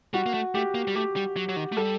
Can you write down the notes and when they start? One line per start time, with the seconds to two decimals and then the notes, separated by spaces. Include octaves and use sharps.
0.14 G3 F#4
0.26 A#3
0.34 A3
0.54 A3 G4
0.75 A#3
0.88 G3
0.95 A3 G4
1.16 G3
1.37 F#3
1.49 F#3
1.56 D#3
1.72 A3
1.77 G3 A4